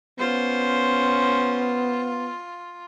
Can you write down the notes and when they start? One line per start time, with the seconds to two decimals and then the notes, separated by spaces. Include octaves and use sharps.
0.19 B3 C#4 F4 C5